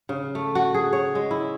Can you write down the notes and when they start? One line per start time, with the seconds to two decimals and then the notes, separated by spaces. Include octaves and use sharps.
0.09 C#3
0.35 A3
0.55 F#4
0.74 G#4
0.93 C#5
1.15 G#3
1.31 E4